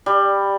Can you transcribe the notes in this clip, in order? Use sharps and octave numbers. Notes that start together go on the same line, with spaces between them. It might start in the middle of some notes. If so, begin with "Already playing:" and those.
G3